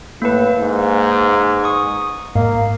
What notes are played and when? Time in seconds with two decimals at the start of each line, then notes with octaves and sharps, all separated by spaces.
0.22 A2 A#3 B4
0.61 G#2
1.64 C#6 D#6
2.36 G#2 A#3 F5